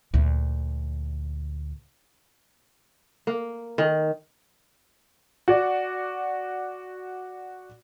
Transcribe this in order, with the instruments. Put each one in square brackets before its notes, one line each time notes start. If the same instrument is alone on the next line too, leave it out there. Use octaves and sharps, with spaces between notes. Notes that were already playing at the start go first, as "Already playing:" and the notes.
[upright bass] D2 A#2
[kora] A#3
D#3
[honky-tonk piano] F#4 D5